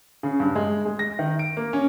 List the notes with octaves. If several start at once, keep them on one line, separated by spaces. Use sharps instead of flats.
C#3
G2
G#3
G#3
A#6
D#3
D7
A#3
C#4